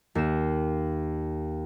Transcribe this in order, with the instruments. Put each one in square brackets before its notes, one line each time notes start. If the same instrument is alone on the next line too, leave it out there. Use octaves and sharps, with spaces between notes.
[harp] D#2 E7